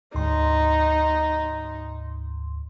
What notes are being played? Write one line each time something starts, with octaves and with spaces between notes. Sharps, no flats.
D2 G#2 D#4 C6